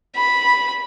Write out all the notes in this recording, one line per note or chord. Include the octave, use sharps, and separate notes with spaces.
B5